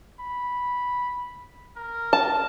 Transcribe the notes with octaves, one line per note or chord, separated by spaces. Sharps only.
B5
A#4
A5